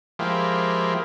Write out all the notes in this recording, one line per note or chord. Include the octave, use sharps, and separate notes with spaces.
F3 G#3 A#3 E4 G4